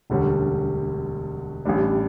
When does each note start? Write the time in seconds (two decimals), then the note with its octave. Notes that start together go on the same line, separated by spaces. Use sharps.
0.10 E1 D2 D3 G3 C#4
1.65 A1 A2 G3 D4